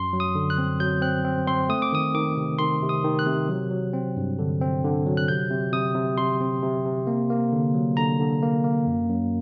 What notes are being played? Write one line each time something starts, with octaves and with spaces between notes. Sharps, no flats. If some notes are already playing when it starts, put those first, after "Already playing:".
Already playing: F#2 C6
F#3
D#6
D3
F#6
C4
F#3 G6
C4 F#6
C4
C4 C6
A3 D#6
D6
D#3 D#6
D#3 D6
C3
D#3 C6
C3
D#6
D#3
F#6
C3
F#3
F#3
C4
G2
D3
C4
D3
F#3
F#6
C3 G6
C3
C3 D#6
C3
C3 C6
C4
C3
C3
A#3
A#3
D3
F#3
D3 A#5
D3
A#3
A#3
F#2
F#2